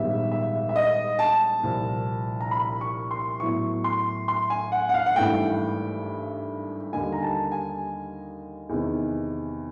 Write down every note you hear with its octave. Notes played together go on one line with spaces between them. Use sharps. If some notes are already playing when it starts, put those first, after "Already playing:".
Already playing: A#1 G#2 D#3 G3 B3 E5
E5
E5
D#5
A5
C2 A#2 F3
A#5
B5
C#6
C6
A2 F#3 B3 E4 C#6
C6
C6
G#5
F#5
F#5
F5
F#5
G#1 G2 E3 A3 G5
D#2 D3 G3 A#3 D#4 G#5
A#5
A5
G#5
E2 C3 D#3